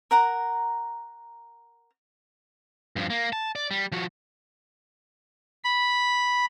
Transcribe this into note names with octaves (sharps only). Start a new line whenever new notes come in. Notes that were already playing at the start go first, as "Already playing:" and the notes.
A#4 F#5 A#5
G2 F3
A#3
A5
D5
G3
F3 F#4
B5